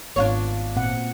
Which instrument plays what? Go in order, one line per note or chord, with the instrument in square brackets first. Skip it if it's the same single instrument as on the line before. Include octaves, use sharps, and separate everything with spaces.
[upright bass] G#1 [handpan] B3 [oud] D4 F4 C#5
[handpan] A#2 C4 F#5